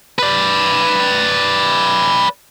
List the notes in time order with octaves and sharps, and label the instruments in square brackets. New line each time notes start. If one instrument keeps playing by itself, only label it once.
[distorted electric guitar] B4 D5